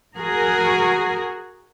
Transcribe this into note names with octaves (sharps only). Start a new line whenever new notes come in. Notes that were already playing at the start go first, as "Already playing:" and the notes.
F#4 G#4 A#4